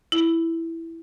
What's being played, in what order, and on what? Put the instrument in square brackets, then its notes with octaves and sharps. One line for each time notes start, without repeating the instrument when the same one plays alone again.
[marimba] E4